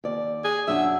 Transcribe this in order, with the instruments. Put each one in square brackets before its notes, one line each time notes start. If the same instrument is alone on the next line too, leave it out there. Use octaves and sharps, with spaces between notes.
[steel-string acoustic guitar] D#2 D5
[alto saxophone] G#4
[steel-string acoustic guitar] F#2 D4 F#5 [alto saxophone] E5